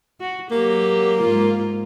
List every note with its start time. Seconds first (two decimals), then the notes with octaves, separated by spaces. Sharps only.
0.20 F#4
0.51 F#3 A#3 G4
1.22 G#2 F4